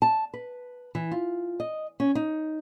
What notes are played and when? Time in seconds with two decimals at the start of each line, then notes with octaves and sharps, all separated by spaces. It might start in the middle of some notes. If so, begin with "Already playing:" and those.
0.02 A5
0.34 B4
0.95 E3
1.11 F4
1.60 D#5
2.00 C#4
2.15 D#4